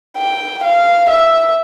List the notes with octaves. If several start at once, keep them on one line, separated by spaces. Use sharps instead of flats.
G5
F5
E5